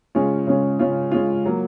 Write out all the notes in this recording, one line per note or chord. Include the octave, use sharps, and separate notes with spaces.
C#3 G#3 C#4 F4
C#3 G#3 C#4 F4
C#3 G#3 C#4 F4
C#3 G#3 C#4 F4
F#3 A#3